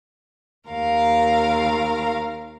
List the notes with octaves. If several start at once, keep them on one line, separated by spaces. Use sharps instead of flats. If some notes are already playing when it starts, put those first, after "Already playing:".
D#2 A#4 F5